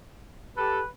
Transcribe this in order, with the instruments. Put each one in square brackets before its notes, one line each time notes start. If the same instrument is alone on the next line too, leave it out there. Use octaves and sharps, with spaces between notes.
[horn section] G4 A4 [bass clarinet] B4